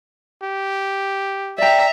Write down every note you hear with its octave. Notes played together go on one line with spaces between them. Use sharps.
G4
D5 E5 G5 A#5